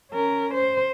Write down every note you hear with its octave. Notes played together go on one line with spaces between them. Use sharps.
C#4 A#4
C5